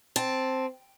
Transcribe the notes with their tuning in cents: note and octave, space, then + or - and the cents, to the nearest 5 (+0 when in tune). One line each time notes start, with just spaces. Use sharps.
C4 +0 A5 +0